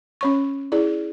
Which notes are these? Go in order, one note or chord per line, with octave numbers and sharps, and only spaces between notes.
C#4 C#5 C#6
E4 G#4 D5